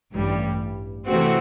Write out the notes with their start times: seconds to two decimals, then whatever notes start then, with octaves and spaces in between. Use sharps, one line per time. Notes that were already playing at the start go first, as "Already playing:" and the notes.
0.13 A1 G2 E3 G3
1.07 C3 E3 A3 C4 F#4